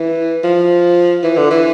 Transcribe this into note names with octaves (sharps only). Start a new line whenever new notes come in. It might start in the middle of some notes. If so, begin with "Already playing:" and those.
Already playing: E3
F3
E3
D3
E3